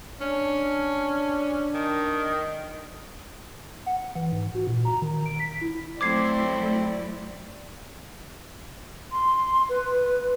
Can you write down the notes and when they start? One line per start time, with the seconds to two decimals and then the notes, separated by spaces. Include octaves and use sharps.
0.21 C#4 D4
1.74 D#3
3.86 F#5
4.15 E3
4.32 G#2
4.55 F#4
4.67 A#2
4.85 A#5
5.02 D#3
5.26 D7
5.40 B6
5.61 E4
6.01 F#3 A3 C4 E4 D5 D6 G#6 C7
9.12 C6
9.69 B4